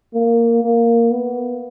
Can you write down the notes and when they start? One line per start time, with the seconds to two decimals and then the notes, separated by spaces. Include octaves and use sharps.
0.14 A#3
0.63 A#3
1.12 B3